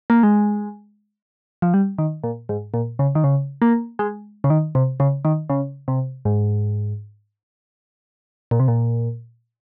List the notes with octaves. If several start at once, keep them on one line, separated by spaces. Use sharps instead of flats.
A#3
G#3
F3
G3
D#3
A#2
G#2
A#2
C#3
D#3
C#3
A#3
G#3
C#3
D#3
C3
C#3
D#3
C#3
C3
G#2
A#2
C3
A#2